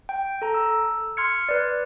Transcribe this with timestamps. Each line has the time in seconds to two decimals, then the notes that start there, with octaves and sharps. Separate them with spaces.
0.09 G5
0.42 A4 A#5
0.54 E6
1.17 C6 F6 G#6 C#7
1.49 B4 D5